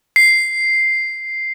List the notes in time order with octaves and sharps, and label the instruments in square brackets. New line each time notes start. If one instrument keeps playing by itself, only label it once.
[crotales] C7